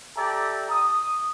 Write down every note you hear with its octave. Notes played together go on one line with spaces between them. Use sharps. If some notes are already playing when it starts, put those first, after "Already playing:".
G4 A4 D5 E5 A#5
D#6